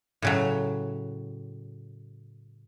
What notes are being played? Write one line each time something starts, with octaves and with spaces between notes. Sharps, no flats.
A2 C#3 F#3